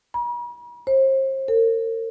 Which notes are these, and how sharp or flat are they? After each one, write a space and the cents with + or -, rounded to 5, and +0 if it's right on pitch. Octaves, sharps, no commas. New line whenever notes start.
B5 -45
C5 +35
A#4 -45